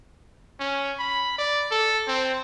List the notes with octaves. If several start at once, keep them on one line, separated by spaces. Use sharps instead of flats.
C#4
B5
D5
A4
C4